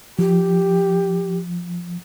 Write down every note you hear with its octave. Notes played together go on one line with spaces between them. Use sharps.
F3 G4